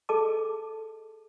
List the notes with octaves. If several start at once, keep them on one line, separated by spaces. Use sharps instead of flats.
G#4 A4 D#5 A5 D6